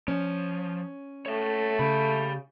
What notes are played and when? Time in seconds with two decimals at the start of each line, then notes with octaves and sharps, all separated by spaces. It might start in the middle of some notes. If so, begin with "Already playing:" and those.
0.08 F3 C#4
1.26 A3 C#5 E5
1.79 C#3 G4 B5